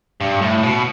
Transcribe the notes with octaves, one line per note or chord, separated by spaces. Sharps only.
G2
A2
B2